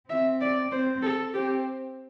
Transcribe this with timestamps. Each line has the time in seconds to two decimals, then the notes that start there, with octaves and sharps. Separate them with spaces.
0.10 C4 E5
0.41 D5
0.72 C4 C5
1.03 A4
1.34 C4 G4